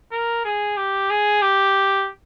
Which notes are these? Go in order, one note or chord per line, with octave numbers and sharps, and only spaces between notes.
A#4
G#4
G4
G#4
G4